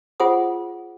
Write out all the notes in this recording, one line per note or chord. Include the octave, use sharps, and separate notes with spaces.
F4 G#4 C5 F#5 D#6